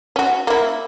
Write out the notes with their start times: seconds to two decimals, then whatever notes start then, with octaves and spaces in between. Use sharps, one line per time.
0.16 C#4 F#4
0.47 A#3 E4